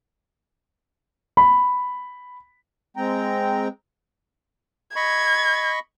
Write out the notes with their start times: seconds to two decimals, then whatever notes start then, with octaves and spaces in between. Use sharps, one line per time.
1.37 B5
2.97 G#3 C4 G5 A#5
4.96 D#5 B5 C#6 G#6